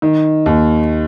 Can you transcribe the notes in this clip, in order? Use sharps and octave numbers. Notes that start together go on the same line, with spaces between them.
D#3
D#2